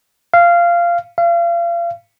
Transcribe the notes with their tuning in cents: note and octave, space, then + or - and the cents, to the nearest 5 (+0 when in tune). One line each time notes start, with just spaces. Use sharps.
F5 -15
F5 -35